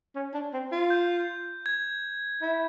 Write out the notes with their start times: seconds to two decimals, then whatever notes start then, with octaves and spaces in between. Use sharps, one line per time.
0.15 C#4
0.34 D4
0.53 C4
0.72 F4
0.90 G6
1.66 G#6
2.42 E4